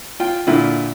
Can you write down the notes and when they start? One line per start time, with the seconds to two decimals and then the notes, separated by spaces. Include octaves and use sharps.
0.20 F4 G5
0.47 A#2 D3 E4 F4